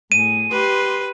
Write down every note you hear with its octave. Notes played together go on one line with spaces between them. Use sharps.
A2 G#4 D#7
G4 B4 C6